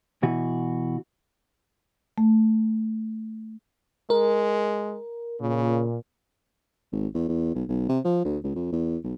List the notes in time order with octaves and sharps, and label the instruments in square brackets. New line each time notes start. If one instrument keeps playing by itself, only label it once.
[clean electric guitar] B2 E3 F#4
[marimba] A3
[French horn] G#3 [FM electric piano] A#4
[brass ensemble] A#2 [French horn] C#3
[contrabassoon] G#1
E2
E2
B1
B1
C3
F3
D2
C#2
F2
E2
B1